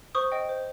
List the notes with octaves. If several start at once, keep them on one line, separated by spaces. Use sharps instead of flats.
C5 C#6 D#6
D#5 G5
C5